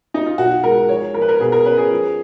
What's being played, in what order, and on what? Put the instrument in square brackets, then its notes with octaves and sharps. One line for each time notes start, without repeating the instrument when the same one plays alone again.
[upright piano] D#4
F4
B1 F#4
G#3 A#4
F3 C#5
F3 A#4
B4
A#4
B2 G#4
A#4
C#4 B4
G#4
F3